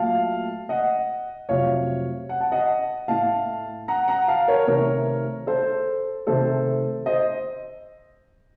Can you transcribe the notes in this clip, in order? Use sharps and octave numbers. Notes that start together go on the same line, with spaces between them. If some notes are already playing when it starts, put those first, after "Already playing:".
Already playing: A#2 F#3 A3 F5 A5
D#5 F#5
F2 C3 F#3 A3 C#5 F5
F#5
A5
D#5 F#5
A2 A3 F5 A5
F#5 A#5
F#5 A#5
F5 A5
A#4 C#5
C3 D#3 A3 A#4 C#5
A4 C5
C3 D#3 A3 A4 C5
C5 D#5